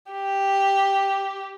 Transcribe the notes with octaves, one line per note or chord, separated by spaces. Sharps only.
G4